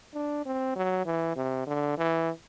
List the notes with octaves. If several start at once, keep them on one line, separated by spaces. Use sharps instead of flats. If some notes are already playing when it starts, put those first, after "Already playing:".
D4
C4
F#3
E3
C3
D3
E3